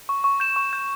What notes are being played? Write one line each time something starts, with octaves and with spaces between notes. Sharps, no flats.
C#6
C#6
G6 E7
C#6
G6